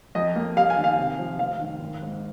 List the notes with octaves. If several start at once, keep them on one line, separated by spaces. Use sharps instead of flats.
F2 D#5
A#3
G3 F5
G#5
D#3
F5
C3
F3
F1 F5
D#3
G#1
G#2